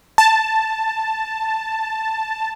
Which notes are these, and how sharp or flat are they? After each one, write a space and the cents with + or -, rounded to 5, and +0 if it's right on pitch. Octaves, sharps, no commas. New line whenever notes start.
A5 +5